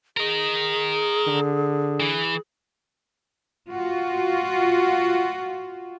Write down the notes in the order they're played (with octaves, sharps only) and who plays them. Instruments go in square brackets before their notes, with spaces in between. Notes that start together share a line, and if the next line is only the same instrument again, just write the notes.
[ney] G#4 [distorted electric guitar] A#4 D#5
[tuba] D3
[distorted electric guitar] E3
[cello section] F4 F#4